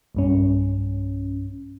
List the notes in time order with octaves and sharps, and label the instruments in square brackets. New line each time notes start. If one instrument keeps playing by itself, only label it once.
[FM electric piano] B1 G2 C#4